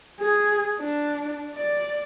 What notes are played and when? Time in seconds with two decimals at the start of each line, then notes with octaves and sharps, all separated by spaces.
0.20 G#4
0.79 D4
1.54 D5